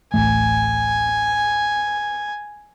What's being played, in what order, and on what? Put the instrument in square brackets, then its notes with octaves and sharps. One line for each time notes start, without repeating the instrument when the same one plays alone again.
[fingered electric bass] D1 A1 A3 [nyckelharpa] G#5